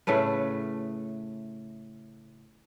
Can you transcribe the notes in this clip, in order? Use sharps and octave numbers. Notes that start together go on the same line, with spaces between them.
A2 C#3 A3 B4